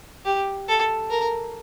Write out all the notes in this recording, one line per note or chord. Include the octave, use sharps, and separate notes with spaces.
G4
A4
A#4